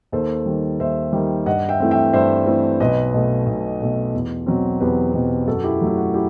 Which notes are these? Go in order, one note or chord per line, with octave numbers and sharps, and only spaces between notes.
D#2 A4 C5
D#3 G3
D#2 C5 E5
D#3 G3
G2 D#5 F#5
E5 G5
E3 A3 C4
E5 G5
G2 C5 E5
E3 A3 C4
B1 B4 D#5
B2 A3
B1
B2 A3
E2
B2 F#3 C4
E2 G4 B4
B2 F#3 C4
F#2 F#4 A4
E4 G4
F#3 A3
E4
F#4
E4 G4